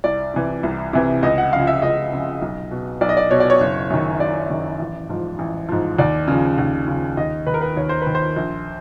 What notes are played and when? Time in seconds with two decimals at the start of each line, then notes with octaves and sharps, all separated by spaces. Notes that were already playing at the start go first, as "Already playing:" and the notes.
0.04 C2 D5
0.34 C3 E3
0.63 C2
0.93 C3 E3
1.23 C#2 D#5
1.38 F#5
1.53 C#3 F3 F5
1.67 E5
1.82 C#2 D#5
2.12 C#3 F3
2.42 B1
2.71 B2
3.01 B1 D5
3.09 D#5
3.17 D5
3.31 B2 C#5
3.40 D5
3.50 C#5
3.61 F#1
3.90 F#2 D#3
4.20 F#1 D5
4.50 F#2 D#3
4.80 A1
5.09 G#2 F3
5.39 A1
5.69 G#2 F3
5.99 D#2 D5
6.28 C#3 F3
6.58 D#2
6.88 C#3 F3
7.17 D#2 D#5
7.47 D#3 B4
7.54 A#4
7.61 B4
7.77 D#2 C#5
7.89 C5
8.02 D#3 B4
8.15 C5
8.36 A#1